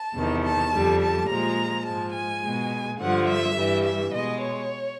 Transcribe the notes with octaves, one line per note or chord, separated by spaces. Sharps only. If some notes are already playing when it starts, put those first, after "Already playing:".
Already playing: A5
E2 C3 D#3
A5
F2 D3 G3
A5
A#2 F3 G#3 A#5
G#2 F3 G#3 A5
G#5
B2 G#3
G2 D3 F3 F#5
E5
G2 E3 G3
E5
B2 G#3 D#5
C#5